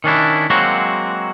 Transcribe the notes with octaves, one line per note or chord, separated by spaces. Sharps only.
D#3 C#4 D4 E4
F#3 G#3 A#3 C4 F#4